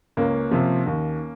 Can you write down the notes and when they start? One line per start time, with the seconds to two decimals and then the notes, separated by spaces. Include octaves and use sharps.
0.17 C#2 A#3 C#4
0.51 C3 F3
0.86 D#2